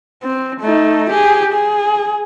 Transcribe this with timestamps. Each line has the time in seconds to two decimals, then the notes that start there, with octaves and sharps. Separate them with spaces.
0.23 C4
0.61 A3 D#4
1.10 G4 G#4
1.53 G#4